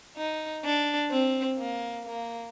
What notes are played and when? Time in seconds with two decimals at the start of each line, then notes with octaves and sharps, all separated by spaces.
0.17 D#4
0.65 D4
1.10 C4
1.58 A#3
2.05 A#3